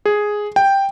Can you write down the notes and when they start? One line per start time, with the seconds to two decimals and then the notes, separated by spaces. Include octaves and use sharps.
0.06 G#4
0.56 G5